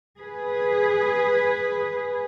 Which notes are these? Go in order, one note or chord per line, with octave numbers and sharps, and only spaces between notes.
G#4 B4